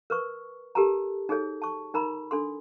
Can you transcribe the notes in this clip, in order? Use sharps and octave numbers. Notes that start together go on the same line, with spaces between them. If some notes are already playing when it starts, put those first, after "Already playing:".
A#4 B4 C#6
G4 A4 A#4 A5 A#5
D#4 G#4 A4 C#5
A5 C#6
D#4 A#4 A#5 B5
D4 A4 C6